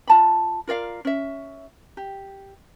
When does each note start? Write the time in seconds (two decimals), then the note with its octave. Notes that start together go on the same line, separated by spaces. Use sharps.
0.07 F4 A5 B5
0.67 F4 A#4 D5 F5
1.05 C#4 E5
1.97 G4